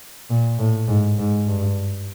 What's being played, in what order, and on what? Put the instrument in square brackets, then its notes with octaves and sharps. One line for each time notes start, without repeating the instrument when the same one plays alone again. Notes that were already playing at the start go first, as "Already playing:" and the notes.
[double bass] A#2
A2
G#2
G#2
G2